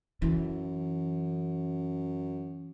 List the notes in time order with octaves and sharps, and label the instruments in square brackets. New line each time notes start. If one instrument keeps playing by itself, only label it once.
[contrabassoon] F#2 [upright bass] E3